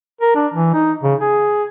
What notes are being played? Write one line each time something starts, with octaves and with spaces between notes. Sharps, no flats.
A#4
D4
E3
D#4
C#3
G#4